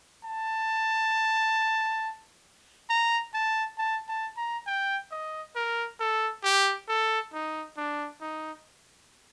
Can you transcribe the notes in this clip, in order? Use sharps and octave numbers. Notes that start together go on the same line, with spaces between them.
A5
A#5
A5
A5
A5
A#5
G5
D#5
A#4
A4
G4
A4
D#4
D4
D#4